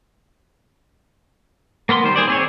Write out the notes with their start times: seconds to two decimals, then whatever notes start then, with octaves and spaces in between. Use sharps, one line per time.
1.89 A#3 B3 A#4 C6
2.04 D#3 G3 C5
2.16 G#4 C5 D5
2.28 C4 G#4 C#5